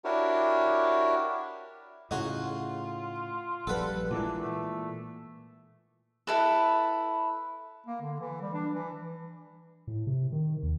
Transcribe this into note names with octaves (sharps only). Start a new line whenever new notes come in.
D4 E4 F#4 G4 A#4 C#5
A2 C#3 D#4 F4 F#4 G#4
A#1 G3 A4 B4 F#5
A#2 E3 G#3 D4
A3
E4 A4 B4
A#3
D3
E3
G3
D4
E3
A2
C3
D#3
D#2